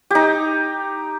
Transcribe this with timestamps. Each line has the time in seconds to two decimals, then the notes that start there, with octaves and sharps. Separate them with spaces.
0.11 D#4 G4